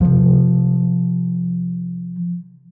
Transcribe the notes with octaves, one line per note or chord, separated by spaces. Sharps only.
C3 F3